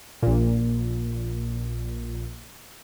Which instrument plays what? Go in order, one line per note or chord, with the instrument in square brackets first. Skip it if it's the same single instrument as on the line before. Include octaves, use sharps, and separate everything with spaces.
[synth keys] A#1 A#2